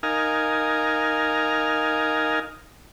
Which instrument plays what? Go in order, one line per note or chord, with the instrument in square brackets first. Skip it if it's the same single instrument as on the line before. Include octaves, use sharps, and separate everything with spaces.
[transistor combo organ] D#4 A#4 F5 G#5